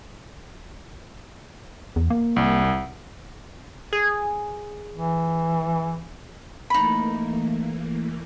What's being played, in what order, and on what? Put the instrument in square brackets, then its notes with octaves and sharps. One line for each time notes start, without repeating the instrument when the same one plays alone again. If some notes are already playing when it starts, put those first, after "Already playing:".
[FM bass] E2
A#3
[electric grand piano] C2
[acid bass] G#4
[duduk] E3
[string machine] E3 A3 A#3 [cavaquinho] D#4 B5